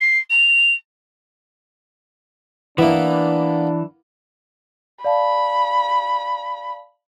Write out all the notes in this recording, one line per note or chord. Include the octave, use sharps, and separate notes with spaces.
C7
F7
E3 A#3 B3 D4 E4 E5
D5 F5 A5 B5